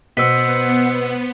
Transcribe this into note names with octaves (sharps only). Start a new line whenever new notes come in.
B2 B3 C5 F#5 E6 B6